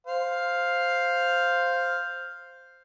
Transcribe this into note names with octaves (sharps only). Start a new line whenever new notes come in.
C5 F5